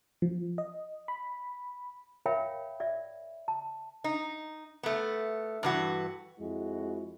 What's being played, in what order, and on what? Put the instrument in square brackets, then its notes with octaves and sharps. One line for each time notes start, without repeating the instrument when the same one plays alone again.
[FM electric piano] F3
D#5
B5
[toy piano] A#4 C#5 E5 F5 G5 B5
D5 E5
A5
[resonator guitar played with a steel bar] D#4
A3 B3
G2 E3 F#4
[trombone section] F2 G#3 E4 F#4